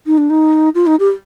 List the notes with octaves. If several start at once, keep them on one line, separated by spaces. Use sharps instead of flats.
D#4
D4
D#4
F4
D#4
G4